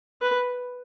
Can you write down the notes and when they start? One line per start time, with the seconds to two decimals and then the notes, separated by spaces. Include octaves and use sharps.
0.22 B4